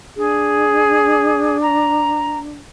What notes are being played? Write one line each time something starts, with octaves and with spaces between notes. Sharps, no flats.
D4 G#4
A#5